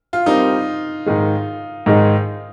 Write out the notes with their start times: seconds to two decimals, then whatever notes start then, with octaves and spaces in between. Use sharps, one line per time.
0.13 F4
0.26 G3 C4 D#4 G4 A#4
1.06 G#2 D#3 G#3
1.86 G#2 D#3 G#3